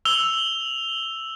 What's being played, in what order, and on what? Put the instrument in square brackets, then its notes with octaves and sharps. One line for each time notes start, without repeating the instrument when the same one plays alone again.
[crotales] E6 F7 G7